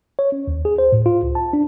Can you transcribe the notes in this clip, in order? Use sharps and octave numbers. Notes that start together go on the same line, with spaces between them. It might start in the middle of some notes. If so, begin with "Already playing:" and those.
C#5
C#4
D#2
G#4
C5
A2
F4
C#2
A5
D4